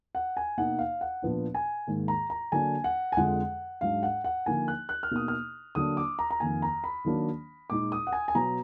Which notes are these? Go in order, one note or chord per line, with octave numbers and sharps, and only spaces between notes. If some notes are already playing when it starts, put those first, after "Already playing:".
F#5
G#5
B2 A#3 D#4 F#5
F5
F#5
A#2 F3 B3 D4
G#5
G#2 D#3 A#3
A#5
A#5
D3 F#3 A#3 D4 G#5
F#5
G#5
F2 D3 F3 G#3 F#5
G#2 F#3 D4 F5
F#5
F#5
D3 F3 A#3 D#4 G#5
F#6
F#6
F6
B2 A#3 D#4 D#6
F6
D3 F#3 A#3 D4 D#6
D6
A#5
A#5
F2 D#3 A#3 G#5
A#5
B5
D#3 F#3 A#3 D4
A#2 G#3 D#4 D6
D#6
F#5
G#5
G#5
B2 F#3 B3 A#5